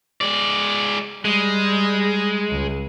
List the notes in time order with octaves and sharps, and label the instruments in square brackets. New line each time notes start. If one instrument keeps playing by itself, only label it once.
[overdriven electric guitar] G#3 D5
[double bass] G3 [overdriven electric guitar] G#3
[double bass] C#2